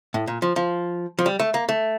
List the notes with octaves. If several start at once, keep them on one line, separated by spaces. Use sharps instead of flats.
A2
A#2
F3
F3
F3
G3
A3
A#3
A3